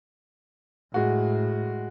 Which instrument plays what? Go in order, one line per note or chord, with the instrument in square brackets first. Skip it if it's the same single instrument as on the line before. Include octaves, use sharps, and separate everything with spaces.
[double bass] A2 [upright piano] G#3 F#4